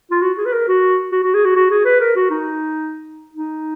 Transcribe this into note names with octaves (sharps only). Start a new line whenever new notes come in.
F4
F#4
G#4
B4
A#4
F#4
F#4
F#4
G#4
F#4
F#4
G#4
B4
A#4
F#4
D#4
D#4